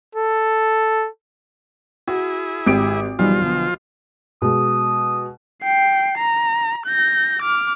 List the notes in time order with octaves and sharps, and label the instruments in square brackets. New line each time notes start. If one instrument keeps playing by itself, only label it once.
[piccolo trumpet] A4
[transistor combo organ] E4 G#4 [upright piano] F#4
[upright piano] G#1 G4 D7
[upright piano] B1 [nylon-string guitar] E3 G3 D#4 [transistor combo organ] F3 F4
[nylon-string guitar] D3 B3
[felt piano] B2 G#3 [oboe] D#6
[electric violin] G5 C7
A#5
G6 A#6
D6 F6